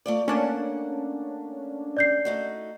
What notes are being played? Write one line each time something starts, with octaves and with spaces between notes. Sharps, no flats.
A3 F4 D5
A3 A#3 C#4 D4 F#5
D5 G6 C7
A3 D#4 F#4